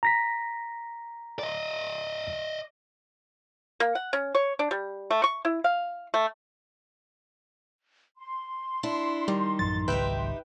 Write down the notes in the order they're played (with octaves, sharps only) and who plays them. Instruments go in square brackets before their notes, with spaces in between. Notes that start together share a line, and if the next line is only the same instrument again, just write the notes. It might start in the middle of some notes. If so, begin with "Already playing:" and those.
[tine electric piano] A#5 A#6 B6
[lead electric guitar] D5 D#5
[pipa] A#3
F#5
C#4
C#5
D4
G3
A3
C#6
E4
F5
A3
[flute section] C6
[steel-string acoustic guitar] D4 E4
[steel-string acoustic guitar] D#3 [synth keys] G3
[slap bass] A1 F#2 F#3 [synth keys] A6
[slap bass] G#1 C#2 F#3 [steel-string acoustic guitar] D#4 G4 E5 [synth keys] B4 G5